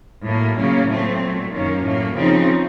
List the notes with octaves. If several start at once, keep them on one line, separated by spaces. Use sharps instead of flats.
A2 F#3 A#3
C#3 F#3 A#3 C#4
A2 F#3 A3 C4
A#2 F#3 A3
F#2 D#3 A#3 C#4
A2 F#3 A#3
C#3 F3 C4 D#4